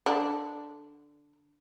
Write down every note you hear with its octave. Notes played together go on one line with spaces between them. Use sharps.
D3 D4